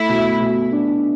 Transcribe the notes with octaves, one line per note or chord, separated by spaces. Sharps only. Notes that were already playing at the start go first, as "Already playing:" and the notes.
Already playing: A3 E4
B2
B2
D4